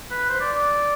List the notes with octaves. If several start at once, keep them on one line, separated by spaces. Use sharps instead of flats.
B4
C5
D5